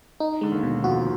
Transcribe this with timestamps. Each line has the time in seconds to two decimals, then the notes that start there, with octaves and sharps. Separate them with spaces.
0.20 D#4
0.41 D3 G#3
0.52 D#2 D#3
0.63 B2
0.84 F2 F3 F#4